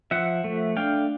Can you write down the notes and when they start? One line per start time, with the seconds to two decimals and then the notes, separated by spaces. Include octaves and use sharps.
0.11 F3 E5 F#5
0.44 A3
0.77 D4 F5 G5